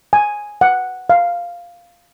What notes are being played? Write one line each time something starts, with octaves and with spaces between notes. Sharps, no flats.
G#5
F#5
F5